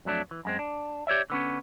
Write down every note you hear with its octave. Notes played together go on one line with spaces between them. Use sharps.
F2 F#3 A3 D4
E3
F#2 G#3 C4
D4
G4 C#5 D5 E5
D3 B3 C#4